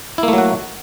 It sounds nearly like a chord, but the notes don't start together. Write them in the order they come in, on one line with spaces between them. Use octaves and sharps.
E4 A#3 A3 F#3 F#4